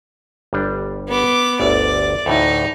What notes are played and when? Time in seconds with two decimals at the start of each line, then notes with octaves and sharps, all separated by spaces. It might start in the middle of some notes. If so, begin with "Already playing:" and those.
0.53 G1 G3 D4
1.08 B3 D6
1.60 G1 D2 D5 A5
2.26 D2 A2 E3 D#4